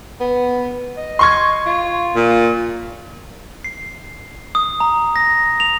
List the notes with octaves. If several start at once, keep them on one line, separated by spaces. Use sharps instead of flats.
B3
D#5
C6 C#6 G#6
F4
A#2
C7
D#6
A#5
A#6
F7